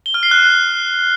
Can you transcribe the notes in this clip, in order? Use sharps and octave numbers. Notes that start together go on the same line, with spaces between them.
G7
F6
C7
F#6